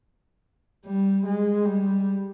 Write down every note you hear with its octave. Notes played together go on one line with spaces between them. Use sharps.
G3
G#3
G3